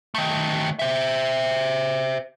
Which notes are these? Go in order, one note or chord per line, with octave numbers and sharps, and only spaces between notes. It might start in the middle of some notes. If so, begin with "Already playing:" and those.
D#3 A3
C5 E5